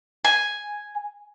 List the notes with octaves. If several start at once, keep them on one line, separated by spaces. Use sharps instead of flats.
G#5